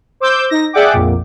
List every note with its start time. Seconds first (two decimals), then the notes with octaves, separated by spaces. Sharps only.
0.20 C5 D6 E6 G6
0.50 D#4 A#6
0.73 G#4 D5 E5 F#5 G5 D6
0.93 A#1 F2 A#2